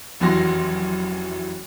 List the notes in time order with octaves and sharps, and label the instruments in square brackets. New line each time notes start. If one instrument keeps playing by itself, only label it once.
[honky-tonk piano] F1 F#2 E3 F#4 C6 A#6